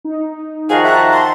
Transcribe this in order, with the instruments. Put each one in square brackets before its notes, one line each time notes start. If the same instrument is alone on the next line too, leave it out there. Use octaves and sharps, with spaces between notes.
[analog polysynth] D#4
[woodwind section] D#3 F3 F#4 [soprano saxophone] G#4 [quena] F5
[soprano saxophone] E5 [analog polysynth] A5 A#5 [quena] F#6
[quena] C6